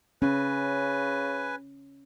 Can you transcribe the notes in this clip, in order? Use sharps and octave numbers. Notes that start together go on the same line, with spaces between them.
C#3 C#4 B4 G#5